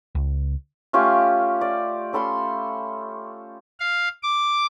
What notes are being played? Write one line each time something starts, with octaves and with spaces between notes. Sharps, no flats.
C#2
A3 C#4 F4 G4
D5
C#4 A4 B5 C6
F5
D6